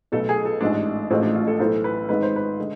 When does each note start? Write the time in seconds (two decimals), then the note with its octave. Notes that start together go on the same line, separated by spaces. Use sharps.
0.12 B1 B2 A3 A4
0.29 G#4
0.45 A4
0.61 A1 G#2 G#3 D4
1.10 A1 A2 F3 G#3 C4
1.23 D4
1.35 F4
1.47 A4
1.59 B1 A2 E3 A3 C5
1.84 B4
2.09 G#1 G#2 G#3 B4
2.23 C5
2.36 B4
2.60 D3 G#3